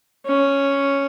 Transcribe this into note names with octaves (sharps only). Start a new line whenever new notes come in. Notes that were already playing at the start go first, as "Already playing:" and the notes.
C#4